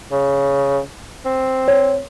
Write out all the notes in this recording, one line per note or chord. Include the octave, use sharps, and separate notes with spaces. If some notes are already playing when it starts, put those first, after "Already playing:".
C#3
C4
C#5